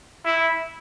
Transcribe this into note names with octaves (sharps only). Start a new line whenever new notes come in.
E4